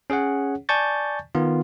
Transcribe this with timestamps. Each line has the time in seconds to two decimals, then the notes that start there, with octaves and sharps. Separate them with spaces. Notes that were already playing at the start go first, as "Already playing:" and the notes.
0.10 C#4 G#4 C#5 F#5
0.69 D5 G#5 A5 C#6 G6 A6
1.35 D#3 B3 F4